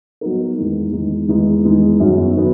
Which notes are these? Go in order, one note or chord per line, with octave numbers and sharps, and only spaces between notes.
F#3 B3 D#4 A#4
E2 D#3 G#3 D#4
E2 D#3 G#3 D#4
E2 D#3 G#3 D#4
E2 D#3 G#3 D#4
F#2 D#3 F#3 B3
D#3 F#3 B3